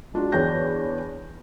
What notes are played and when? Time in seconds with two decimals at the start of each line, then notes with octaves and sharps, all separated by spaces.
0.14 G#3 D4 F4 F#4
0.32 E2 D4 C#5 G5 G6 A#6